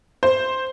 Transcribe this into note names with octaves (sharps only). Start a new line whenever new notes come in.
C5